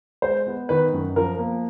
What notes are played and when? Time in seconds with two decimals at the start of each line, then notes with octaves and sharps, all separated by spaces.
0.22 G#3 C5
0.47 B3
0.69 D#3 B4
0.93 F#2
1.16 F3 A#4
1.39 A#3